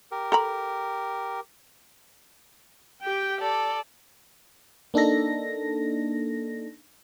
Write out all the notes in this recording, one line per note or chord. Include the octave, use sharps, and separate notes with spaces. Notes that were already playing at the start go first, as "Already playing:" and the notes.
G4 A#4
A4 A#5 B5
G4 G5
A4 D5
A#3 D4 D#4 A4 A#6